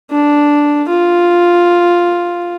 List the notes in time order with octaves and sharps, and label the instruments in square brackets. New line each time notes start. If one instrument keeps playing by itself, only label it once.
[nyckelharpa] D4
F4